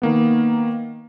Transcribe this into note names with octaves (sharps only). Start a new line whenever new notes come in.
D#3 A#3 B3